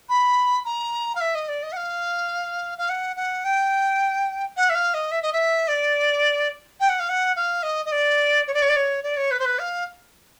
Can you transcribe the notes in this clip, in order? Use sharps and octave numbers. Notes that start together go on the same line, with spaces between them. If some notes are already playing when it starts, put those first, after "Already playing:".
B5
A#5
F5
E5
D#5
D5
D#5
F#5
F5
F5
F#5
F#5
G5
F#5
E5
F5
D#5
E5
D#5
E5
D5
G5
F#5
F5
F#5
F5
D#5
D#5
D5
C#5
D5
C#5
D5
C#5
D5
C#5
B4
C5
B4
F5